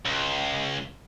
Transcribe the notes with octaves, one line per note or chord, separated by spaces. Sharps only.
C#2